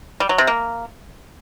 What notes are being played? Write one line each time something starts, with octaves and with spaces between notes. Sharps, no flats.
G3
F#3
C3
A#3